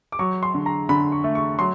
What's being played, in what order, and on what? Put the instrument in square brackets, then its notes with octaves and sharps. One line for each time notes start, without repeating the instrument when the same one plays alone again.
[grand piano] D6
F#3 C#6
C6
D3
A#5
D3 B5
C#6
A3
C#6
F#3 C6